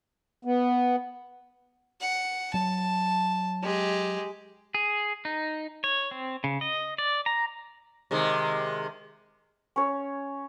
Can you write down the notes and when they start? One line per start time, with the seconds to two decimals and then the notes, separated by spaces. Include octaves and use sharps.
0.45 B3
2.01 F#5
2.54 F#3 A5
3.63 G#3 G4
4.75 G#4
5.25 D#4
5.84 C#5
6.11 C4
6.44 C#3
6.61 D#5
6.98 D5
7.26 A#5
8.11 C3 D#3 G#3
9.76 C#4 C#5